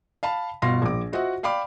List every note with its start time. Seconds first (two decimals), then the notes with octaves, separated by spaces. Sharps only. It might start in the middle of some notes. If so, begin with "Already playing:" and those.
0.23 F5 A5 B5
0.62 G1 B2 F5 C6 A#6
0.82 A#1 D6
1.12 F4 F#4 C5 D#5 E5 F#5
1.43 D5 F5 G5 B5 D6